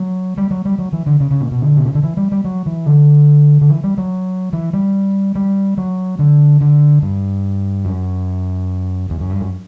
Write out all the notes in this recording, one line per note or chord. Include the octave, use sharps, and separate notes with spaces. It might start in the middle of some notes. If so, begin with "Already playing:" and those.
Already playing: F#3
G3
F#3
G3
F#3
E3
D3
C#3
C#3
A#2
B2
D3
B2
C#3
D3
E3
G3
G3
F#3
E3
D3
D3
E3
G3
F#3
E3
G3
G3
F#3
D3
D3
G2
F#2
E2
F#2
G2
F#2